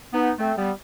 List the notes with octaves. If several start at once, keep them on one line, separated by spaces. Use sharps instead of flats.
B3 D#4
A3 C4
G3 B3